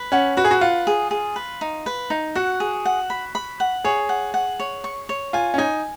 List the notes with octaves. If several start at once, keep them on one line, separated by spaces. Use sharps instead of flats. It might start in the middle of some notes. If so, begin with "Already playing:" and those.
Already playing: B4
C#4 F#5
F#4 B4
G#4
F#4
F4 F#5
G#4
G#4
B4
D#4
B4
D#4
F#4 F#5
G#4
F#5
B5
B5
F#5
G#4 C#5
F#5
F#5
C#5
C#6
C#5
F4 G#5
C#4
D#4 G#5